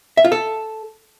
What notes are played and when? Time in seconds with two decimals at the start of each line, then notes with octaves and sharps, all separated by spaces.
0.17 E5
0.25 F4
0.32 A4